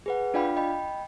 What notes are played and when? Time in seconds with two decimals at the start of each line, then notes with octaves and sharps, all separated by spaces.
0.06 G#4 B4 F#5
0.34 D4 F4 D5 F5 G5 B5
0.57 D#5 G5 B5